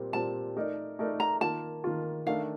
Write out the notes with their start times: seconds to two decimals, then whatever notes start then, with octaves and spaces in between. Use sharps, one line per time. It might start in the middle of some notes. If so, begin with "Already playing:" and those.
Already playing: A#2 G3 C4
0.13 A#2 G3 C4 A5
0.56 A3 D#4 A#4 D5
0.99 A3 D#4 A#4 D5
1.20 A#5
1.41 D#3 A#3 F4 A5
1.84 D#3 A#3 F4
2.27 D#3 A3 D4 F5